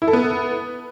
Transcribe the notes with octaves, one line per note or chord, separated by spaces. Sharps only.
E4
A4
B3